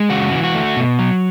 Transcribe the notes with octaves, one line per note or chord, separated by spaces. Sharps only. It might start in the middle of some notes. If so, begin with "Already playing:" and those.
Already playing: G#3
C#3 F#4
E3
F#4
A3
B2
F#3